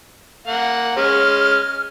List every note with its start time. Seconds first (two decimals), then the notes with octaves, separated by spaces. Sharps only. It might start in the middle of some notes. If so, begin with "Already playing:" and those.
0.47 A#3 F#5
0.97 G#3 C#4 F6